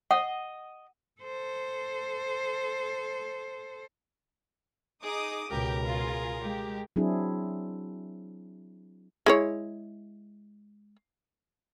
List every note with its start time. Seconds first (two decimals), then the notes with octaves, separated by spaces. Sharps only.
0.11 D#5 F#5
1.21 A4 C5
5.03 D#4 G#4 D6 D#6
5.50 C#2 B2 G4 A#4
5.86 F4 G#4
6.42 G#3 G4
6.96 F#3 C4 D4 E4 G#4
9.26 G#3 E4 C#5